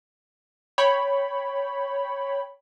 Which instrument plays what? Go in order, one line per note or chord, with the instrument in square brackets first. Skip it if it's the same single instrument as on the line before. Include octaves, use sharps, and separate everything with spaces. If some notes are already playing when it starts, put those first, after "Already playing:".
[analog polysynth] C#5 G5 B5